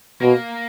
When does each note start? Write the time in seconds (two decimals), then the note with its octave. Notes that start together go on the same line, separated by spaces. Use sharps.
0.21 B2 A#3